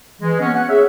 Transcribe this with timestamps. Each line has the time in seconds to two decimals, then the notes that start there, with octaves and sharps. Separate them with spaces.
0.21 E3 G#3
0.40 A#3 B3 C#4
0.54 F#5
0.69 G#4 C#5 E5